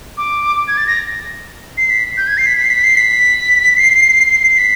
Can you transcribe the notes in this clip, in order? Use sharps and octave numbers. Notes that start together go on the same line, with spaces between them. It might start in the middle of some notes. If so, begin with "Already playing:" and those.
D6
G#6
A6
A#6
C7
B6
G6
G#6
C7
B6
B6
C7
B6
C7
B6
C7
B6